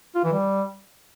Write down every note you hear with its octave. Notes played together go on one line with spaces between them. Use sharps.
F4
E3
G3